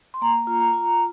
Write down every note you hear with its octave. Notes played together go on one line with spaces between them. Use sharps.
C6
A#3 A#5
F4
A#5
F4